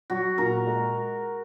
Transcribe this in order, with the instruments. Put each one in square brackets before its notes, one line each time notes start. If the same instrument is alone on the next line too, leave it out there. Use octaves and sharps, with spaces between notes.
[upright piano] F#3 [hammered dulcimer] F#4
[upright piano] A#2 [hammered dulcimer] A#4
[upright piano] G#3